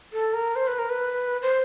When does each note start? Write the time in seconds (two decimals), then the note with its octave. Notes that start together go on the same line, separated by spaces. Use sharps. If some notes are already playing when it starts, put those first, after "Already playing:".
0.13 A4
0.34 A#4
0.56 C5
0.67 B4
0.78 A#4
0.90 B4
1.42 C5